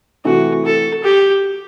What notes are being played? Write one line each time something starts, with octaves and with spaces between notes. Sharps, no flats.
C3 E3 A3 F#4
A4
G4